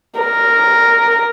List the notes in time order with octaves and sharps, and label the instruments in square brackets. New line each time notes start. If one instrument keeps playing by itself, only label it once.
[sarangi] A#4